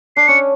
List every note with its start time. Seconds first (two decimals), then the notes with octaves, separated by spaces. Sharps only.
0.17 D4 C7
0.28 C#4 C#7